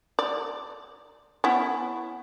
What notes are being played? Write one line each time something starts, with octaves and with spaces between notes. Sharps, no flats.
D5
B3 C#4 E4